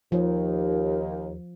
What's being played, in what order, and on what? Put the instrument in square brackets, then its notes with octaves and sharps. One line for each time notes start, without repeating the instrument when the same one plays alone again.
[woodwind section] D#2 [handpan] F3